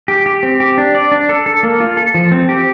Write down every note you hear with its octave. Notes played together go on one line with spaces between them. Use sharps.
G4
G4
C4
G4
D4
D5
D4
A4
A4
A#3
F4
A4
F3
C4
G4